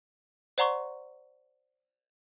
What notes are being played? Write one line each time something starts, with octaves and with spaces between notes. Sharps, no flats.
C5 D5 F#5 A#5 C6 C#6